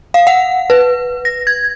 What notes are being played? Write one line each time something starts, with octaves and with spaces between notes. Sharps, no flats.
F5
F#5
B4
A#6
G#6